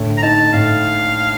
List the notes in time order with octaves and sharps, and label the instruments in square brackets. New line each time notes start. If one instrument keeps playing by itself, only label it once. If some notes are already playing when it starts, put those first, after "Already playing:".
Already playing: [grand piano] A2 D3
[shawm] A#5
[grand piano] D#4 [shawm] A5
[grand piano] A2 [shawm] F5